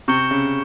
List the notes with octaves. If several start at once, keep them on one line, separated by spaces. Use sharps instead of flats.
C3 C#6 G6 C#7 G7
C#3